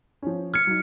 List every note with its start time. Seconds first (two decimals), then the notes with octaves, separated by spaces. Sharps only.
0.22 F3 C#4
0.54 F6 G#6 C#7
0.67 F#3 D#4